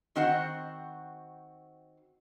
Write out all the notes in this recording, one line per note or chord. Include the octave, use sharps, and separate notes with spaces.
D#3 C4 F#4 C5 F#5